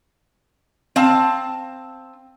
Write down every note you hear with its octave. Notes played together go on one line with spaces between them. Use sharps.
C4 F5 A5